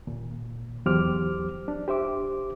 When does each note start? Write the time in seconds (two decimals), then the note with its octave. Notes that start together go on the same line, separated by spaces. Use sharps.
0.07 D#2 A#2
0.86 E2 F#3 G4 C5 D6 F6
1.68 D4
1.88 G4 C5 E5 D6